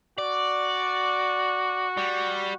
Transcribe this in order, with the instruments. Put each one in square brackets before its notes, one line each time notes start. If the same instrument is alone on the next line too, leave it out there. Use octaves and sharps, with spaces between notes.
[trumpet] F#4 [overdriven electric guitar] D5
[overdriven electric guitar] G3